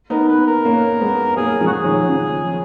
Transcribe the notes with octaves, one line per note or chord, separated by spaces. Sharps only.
B3 D#4 A#4
B4
A#4
A#3 C#4
G#3 B3
F#3 A#3 G#4
F3 G#3
F#4
G#4
D#3 F#3
C#3 F3